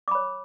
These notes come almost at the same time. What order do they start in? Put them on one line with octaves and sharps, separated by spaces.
D6 B5 C#5